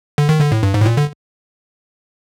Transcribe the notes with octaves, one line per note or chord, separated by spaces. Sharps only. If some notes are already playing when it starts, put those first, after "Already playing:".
D3
D#3
D3
A2
G2
G#2
A2
A#2
D3